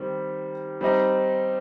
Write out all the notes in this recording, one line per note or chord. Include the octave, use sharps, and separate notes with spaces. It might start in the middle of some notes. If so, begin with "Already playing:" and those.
Already playing: D#3 G3 C4
G3 C4 D#4